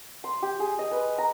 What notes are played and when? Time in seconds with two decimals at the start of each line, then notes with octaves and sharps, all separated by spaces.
0.24 C6
0.43 G4
0.60 G#4
0.79 D#5
0.91 B4
1.18 A#5